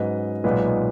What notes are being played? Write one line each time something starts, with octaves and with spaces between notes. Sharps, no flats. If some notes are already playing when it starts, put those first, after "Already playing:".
Already playing: G#2 F#3 C#4 B4 D#5
B1 A#2 G#3 B3 D#4 B4 D#5